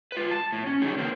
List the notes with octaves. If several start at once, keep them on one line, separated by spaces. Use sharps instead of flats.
F4 B4
A5
A2
C#4
C#3 F#3 D#4 G#4
A#3 C4